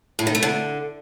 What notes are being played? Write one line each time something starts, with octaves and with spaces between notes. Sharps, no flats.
A2
D#3
A3
D3